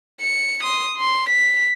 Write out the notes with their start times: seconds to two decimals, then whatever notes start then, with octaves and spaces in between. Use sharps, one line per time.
0.21 C#7
0.63 C6 D#6
0.97 C6
1.29 B6